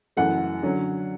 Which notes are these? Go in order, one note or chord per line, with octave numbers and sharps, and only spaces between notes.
F#2 C#3 E3 A3 F#5
D3 F#3 C#4